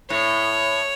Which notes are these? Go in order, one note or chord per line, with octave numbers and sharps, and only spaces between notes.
A2 C#5